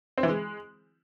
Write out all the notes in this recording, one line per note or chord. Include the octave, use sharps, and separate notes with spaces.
C4
E3
G#3